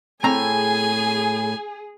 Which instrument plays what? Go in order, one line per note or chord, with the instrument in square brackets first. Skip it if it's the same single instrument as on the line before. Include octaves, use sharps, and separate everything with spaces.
[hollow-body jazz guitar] A2 C4 A#5 [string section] G#4 [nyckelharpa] G#5